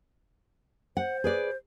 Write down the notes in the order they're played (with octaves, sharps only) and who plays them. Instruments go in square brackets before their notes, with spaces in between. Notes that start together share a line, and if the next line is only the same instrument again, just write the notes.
[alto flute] C5 [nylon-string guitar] F#5
[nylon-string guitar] G#4 B4 D5